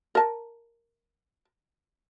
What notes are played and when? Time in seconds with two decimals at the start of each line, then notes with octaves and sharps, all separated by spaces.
0.15 A#4 A5